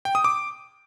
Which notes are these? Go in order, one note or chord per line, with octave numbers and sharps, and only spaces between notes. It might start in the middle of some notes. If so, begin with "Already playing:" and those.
G5
D#6
D6